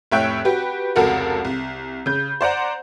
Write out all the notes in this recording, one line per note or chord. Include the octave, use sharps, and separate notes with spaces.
F1 A2 C#5 E5 G5 F#6
F#4 G4 B4
F1 C#2 F#4 A4 A#4 F#5
C2
C#3 G6
C5 D5 F#5 A#5